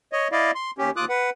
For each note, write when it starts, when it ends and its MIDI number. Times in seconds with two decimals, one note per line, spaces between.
0.13 0.28 73
0.13 0.28 75
0.32 0.51 64
0.32 0.51 74
0.32 0.51 75
0.32 0.51 77
0.55 0.71 84
0.78 0.90 39
0.78 0.90 61
0.78 0.90 67
0.96 1.05 39
0.96 1.05 65
0.96 1.05 86
0.96 1.05 87
0.96 1.05 90
1.09 1.30 71
1.09 1.30 78